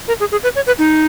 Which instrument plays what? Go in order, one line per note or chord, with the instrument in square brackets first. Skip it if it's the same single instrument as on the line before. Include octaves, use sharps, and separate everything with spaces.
[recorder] A#4
G#4
G#4
B4
C#5
B4
D#4